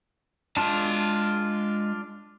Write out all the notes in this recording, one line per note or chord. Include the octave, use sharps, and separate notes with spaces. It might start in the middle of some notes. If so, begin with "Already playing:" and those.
G#3 D4 F4 A5